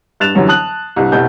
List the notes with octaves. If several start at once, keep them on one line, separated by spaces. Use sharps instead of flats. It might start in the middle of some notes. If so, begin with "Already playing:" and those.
G2 F#6 A6 E7 F7
F#2 D3 E3 F#3 G3
A5 D#6 F#6 F#7
C2 G2
F1 B2 E4 G6